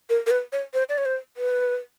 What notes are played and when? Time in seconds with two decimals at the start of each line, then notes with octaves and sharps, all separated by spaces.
0.10 A#4
0.27 A#4
0.31 B4
0.52 C#5
0.74 C5
0.89 D5
0.98 C#5
1.05 C5
1.37 B4